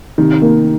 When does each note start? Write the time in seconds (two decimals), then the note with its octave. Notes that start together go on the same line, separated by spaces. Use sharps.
0.18 C3 D#3
0.42 A#3